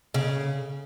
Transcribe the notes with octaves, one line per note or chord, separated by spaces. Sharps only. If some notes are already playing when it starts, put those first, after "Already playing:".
C#3